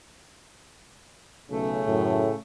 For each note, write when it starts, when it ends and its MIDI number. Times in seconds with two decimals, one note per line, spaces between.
1.50 1.82 35
1.50 2.36 49
1.50 2.36 57
1.87 2.25 42
1.87 2.32 45